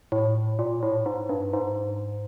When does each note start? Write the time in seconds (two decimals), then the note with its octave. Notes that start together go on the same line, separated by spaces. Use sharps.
0.12 A2
0.59 A#2
0.83 A2
1.06 G#2
1.29 G2
1.53 G#2